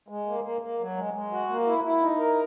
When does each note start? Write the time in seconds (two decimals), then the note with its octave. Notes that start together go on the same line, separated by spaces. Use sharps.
0.08 G#3
0.26 A#3
0.44 A#3
0.61 A#3
0.79 F#3
0.96 G#3
1.14 G#3
1.32 F#4
1.49 A#3
1.66 E4
1.84 E4
2.01 D#4
2.19 A#4